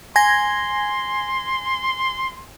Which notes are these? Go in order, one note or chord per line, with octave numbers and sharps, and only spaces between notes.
G#5 C6 G#6 A#6